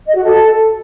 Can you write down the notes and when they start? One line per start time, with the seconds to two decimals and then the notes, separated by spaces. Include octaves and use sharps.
0.06 D#5
0.15 F#4
0.23 A4